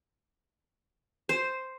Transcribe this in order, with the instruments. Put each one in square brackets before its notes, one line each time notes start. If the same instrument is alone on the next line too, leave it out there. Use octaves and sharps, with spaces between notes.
[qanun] C5